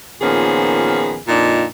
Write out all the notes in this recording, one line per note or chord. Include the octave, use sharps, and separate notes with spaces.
A#2 D#3 F3 B3 C#4 G#4
F2 A#2 D4 D#4